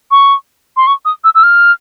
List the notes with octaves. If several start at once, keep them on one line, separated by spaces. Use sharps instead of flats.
C#6
C6
C#6
D#6
E6
E6
F6